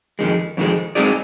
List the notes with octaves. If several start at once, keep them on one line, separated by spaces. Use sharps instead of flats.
F2 D#3 G#3
F2 D#3 G#3
G#3 C4 D#4 G#4 D5